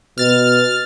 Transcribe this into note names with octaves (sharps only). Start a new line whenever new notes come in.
B2 F6 A6